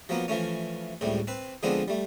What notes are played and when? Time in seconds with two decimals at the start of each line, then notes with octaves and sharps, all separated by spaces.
0.09 F3 F#3 A#3 B3
0.28 E3 F3 A3 C#4
1.01 C#2 A2 C3 G3
1.27 C4 B4
1.63 D3 F3 G#3 B3 C4 D4
1.88 G3 A3